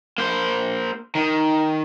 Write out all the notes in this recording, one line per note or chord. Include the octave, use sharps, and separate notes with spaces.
A#3 C5
D#3